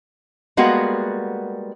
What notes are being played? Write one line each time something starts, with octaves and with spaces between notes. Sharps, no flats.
G3 G#3 A#3 B3 F#4